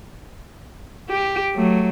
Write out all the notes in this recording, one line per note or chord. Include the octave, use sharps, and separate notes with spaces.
G4
F#3 A3